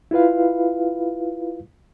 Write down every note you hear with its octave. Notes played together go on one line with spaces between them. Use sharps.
E4 F4 B4 F5